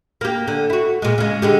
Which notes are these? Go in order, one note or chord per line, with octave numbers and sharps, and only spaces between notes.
A#3 G4
D3
E4 F#4
A#2 G#3
C#3 G#3
D3 G#3 G4